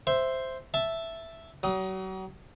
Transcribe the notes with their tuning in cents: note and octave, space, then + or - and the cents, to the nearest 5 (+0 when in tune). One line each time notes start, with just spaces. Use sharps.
C5 +0 E5 +0
E5 +0 A5 +0
F#3 +40 D#6 +15